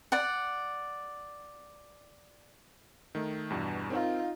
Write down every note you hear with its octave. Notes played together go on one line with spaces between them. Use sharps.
D5 F#5
D#3 A3
E2 G2 B2
C4 D#4 F4 A#4